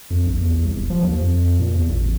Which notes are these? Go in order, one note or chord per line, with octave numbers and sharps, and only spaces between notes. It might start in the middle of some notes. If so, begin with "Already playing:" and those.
F2
A#1
E2
C2
D#1
F3
D#2
F2
A#2
E2
A1